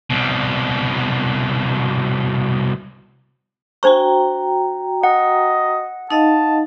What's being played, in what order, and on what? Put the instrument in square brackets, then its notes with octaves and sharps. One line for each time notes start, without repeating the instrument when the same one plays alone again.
[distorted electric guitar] C2 B2
[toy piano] D4 C5 C#6 [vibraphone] F#4 G5 A#5
[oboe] D#5 [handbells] F#5
[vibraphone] D#4 D#5 F5 [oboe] A5